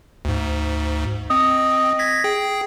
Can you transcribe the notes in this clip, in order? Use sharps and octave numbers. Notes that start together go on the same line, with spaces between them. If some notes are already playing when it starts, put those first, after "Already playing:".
D2 G#2
C4 D#5
G#6 A#6 B6
G#4 G5